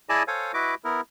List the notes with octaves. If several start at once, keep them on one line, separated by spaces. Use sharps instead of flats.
E4 G#4 D5 D#5 G#5 A5
A4 C5 C#5 F5 G#5
E4 F#4 B4 D#5 D6
B3 E4 A#4